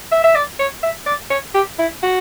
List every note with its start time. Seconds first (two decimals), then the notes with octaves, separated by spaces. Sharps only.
0.12 E5
0.24 E5
0.35 D5
0.59 C#5
0.83 E5
1.06 D5
1.30 C#5
1.54 G4
1.79 E4
2.03 F#4